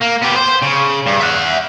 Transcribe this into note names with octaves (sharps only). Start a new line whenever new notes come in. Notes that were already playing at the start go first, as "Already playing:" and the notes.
A#3
B3 G4
C5
C#3
G2
E5 F#5